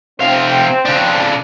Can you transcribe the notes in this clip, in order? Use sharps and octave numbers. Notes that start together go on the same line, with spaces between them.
C3 C4 F5
C#3 D4